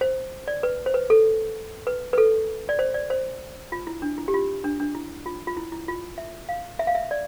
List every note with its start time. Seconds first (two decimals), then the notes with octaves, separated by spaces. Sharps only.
0.01 C5
0.48 D5
0.63 B4
0.86 C5
0.94 B4
1.10 A4
1.87 B4
2.13 B4
2.18 A4
2.69 D5
2.79 C5
2.94 D5
3.10 C5
3.72 F4
3.87 E4
4.02 D4
4.18 E4
4.28 G4
4.34 F4
4.64 D4
4.80 D4
4.95 E4
5.26 F4
5.47 F4
5.57 E4
5.72 E4
5.88 F4
6.18 E5
6.49 F5
6.79 E5
6.87 F5
6.95 E5
7.11 D5